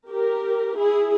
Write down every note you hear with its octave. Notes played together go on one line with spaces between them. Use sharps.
G4 A#4
E4 G#4